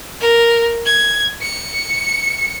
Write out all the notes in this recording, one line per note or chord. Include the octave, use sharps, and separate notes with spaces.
A#4
G#6
C#7